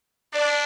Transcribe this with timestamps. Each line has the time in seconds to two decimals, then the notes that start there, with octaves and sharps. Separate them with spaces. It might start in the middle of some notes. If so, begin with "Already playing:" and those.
0.33 D4 D5